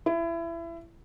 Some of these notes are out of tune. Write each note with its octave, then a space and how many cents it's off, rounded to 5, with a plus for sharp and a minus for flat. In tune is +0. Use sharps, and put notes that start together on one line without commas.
E4 +25